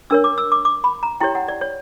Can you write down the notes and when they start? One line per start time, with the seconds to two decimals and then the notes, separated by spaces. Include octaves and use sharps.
0.10 D4 A#4 C#5 E6
0.24 D6
0.38 E6
0.52 D6
0.65 D6
0.84 B5
1.03 A#5
1.21 E4 G4 C#5 G5
1.35 F#5
1.48 D5
1.61 C#5